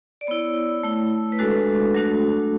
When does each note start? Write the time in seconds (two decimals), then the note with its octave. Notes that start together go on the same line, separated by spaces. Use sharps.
0.21 D5
0.27 B3 E4 C#5
0.83 A3 E4
1.32 B4
1.39 G#3 D4 F#4 A4
1.94 F#3 A3 D4 F#4